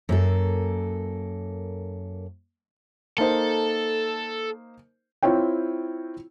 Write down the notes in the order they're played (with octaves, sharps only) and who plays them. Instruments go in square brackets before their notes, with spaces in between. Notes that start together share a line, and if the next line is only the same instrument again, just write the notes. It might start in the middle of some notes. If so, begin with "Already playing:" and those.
[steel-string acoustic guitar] F#2 A#3 A4
[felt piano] A#3 D#4 C5 [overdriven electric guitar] A4
[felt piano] C4 E4 F4 C#5 G5